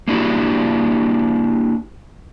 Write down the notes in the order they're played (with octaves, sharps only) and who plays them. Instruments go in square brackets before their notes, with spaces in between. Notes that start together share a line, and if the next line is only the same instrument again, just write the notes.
[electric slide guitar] A#3 D4 E4 F#4 G4